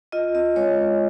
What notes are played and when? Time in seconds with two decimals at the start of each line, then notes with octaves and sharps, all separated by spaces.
0.12 F4 D#5
0.35 C4 D#5
0.56 G#3 C#5